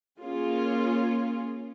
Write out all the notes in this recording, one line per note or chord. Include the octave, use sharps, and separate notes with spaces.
A#3 C#4 F4 G#4